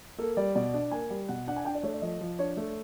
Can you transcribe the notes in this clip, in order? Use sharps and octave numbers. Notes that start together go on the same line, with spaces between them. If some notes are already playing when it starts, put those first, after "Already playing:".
A#3 A4
G3 D5
B2 D5
D4
A#3 G#5
G3
B2 F#5
D4 F#5
G#5
D4 G5
D5
A3 C#5
D5
F3 D#5
F3
D4 C#5
A3